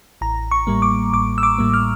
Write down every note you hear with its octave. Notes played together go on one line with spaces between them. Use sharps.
A1 A#5
C#6
A2 G3 A#3
D6
A1 D6
E6
D6
A2 G3 A#3
F6